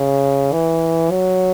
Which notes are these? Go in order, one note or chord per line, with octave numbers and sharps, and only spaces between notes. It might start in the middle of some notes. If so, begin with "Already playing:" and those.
Already playing: C#3
E3
F#3